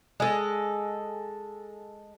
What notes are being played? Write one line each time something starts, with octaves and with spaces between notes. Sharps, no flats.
G#3 A4